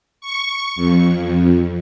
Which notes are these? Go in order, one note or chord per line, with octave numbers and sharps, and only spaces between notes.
C#6
F2